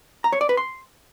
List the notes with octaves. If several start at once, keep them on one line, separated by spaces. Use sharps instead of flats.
A#5
C#5
D5
B4
C6